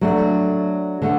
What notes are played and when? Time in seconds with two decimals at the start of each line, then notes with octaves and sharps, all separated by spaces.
0.01 F#3 A3 D4
1.02 D3 A3